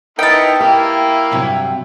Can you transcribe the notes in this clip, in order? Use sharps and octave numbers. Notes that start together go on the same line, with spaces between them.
B3 D#4 E4 A#4 G5 A5
A#3 E4 G4
G2 C3 F#3